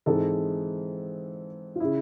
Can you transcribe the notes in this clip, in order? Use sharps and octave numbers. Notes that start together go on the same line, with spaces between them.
G#2 E3 G#3 C4 A4
F4
C#3 E4